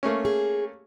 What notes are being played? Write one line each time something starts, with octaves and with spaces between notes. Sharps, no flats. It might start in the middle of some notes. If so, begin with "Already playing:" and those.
A3 A#3 C#4
G#4